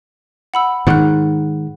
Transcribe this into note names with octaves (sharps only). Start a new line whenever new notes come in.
F#5 B5 E6
G#2 D#3 F#5 F#6